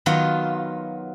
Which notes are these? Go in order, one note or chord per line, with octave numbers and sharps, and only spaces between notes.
D#3 F#3 B3 F4